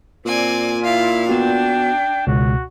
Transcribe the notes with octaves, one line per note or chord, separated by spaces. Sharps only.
A#2 C4 D5 G#5
E4 F4 F5
B3 D4 F#4 G5
C#2 B2 F#4